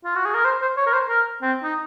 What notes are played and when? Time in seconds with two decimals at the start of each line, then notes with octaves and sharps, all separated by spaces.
0.05 F4
0.15 F#4
0.25 G#4
0.34 A#4
0.45 C5
0.62 C5
0.77 C#5
0.86 A#4
0.93 C5
1.09 A#4
1.42 C4
1.63 D#4